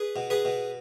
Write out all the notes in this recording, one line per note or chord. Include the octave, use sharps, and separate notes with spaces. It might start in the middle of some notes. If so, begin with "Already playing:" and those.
Already playing: G#4 B4
B2
G#4 B4
B2